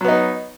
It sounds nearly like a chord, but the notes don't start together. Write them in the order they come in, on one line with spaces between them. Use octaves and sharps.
F#3 B3 D#4